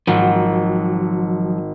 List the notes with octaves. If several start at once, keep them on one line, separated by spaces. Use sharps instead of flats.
G#1 F3 F#3